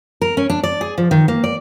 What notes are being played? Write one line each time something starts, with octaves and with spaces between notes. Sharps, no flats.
A#4
C#4
D4
D5
G#4
F3
D#3
A#3
D5